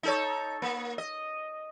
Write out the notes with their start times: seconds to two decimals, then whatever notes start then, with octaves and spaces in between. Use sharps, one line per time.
0.03 D#4 A4 C#5
0.62 A#3
0.98 D#5